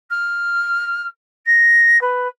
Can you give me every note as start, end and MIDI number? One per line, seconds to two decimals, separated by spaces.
0.10 1.07 89
1.46 2.00 94
2.01 2.28 71